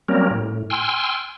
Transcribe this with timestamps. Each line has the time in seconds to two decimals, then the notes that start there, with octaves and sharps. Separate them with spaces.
0.08 F#3 G3 A#3 C4 C#4 A#4
0.31 A2
0.70 G5 G#5 C6 E6 F6